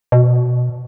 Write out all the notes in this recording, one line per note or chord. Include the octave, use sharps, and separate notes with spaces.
B2